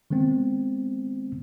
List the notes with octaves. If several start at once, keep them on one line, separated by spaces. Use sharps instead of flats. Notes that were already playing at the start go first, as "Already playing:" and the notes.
D#3 G#3 B3 C4